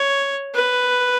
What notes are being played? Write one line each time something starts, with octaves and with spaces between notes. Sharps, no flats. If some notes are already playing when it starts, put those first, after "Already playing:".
Already playing: C#5
B4